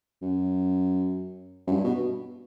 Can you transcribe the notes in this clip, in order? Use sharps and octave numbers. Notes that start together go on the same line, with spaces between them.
F#2
F#2
G2
B2